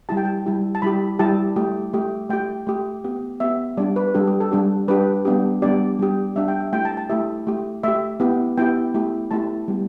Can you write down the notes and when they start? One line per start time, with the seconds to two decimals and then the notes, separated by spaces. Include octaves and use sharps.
0.09 G3 E4 G4 A5
0.17 G5
0.25 A5
0.46 G3 E4 G4
0.75 A5
0.82 G3 E4 G4 B5
1.19 G3 E4 G4 A5
1.56 A3 G4
1.93 A3 G4
2.30 A3 G4 G5
2.67 A3 G4
3.04 B3 G4
3.40 B3 G4 E5
3.77 G3 D4 G4 D5
3.96 B4
4.14 G3 D4 G4 A4
4.27 G4
4.41 A4
4.51 G3 D4 G4
4.88 G3 D4 G4 B4
5.25 G3 B3 D4 G4
5.62 G3 B3 D4 G4 D5
5.99 G3 D4 G4
6.36 G3 D4 G4 E5
6.48 G5
6.60 E5
6.73 A3 E4 G4 G5
6.85 A5
6.97 A5
7.10 A3 E4 G4 E5
7.47 A3 G4
7.83 A3 G4 E5
8.20 B3 E4 G4
8.58 B3 E4 G4 G5
8.94 A3 E4 G4
9.31 A3 E4 G4 A5
9.68 G3 B3 G4